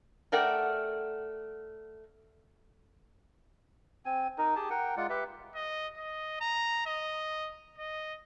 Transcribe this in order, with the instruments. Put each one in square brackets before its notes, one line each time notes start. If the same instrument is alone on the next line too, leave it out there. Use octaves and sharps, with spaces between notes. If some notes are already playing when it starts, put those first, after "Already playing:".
[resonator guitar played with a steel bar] A3 A#4 D5 F#5 G5
[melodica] C4 G#5
D#4 A#4
G4 G#4 A5
A#4 F#5 G5
G#3 F4 D5 F#5
G4 B4 E5
[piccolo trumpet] D#5
D#5
A#5
D#5
D#5